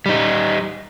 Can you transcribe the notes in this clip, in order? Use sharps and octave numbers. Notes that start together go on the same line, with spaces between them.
G3 D#4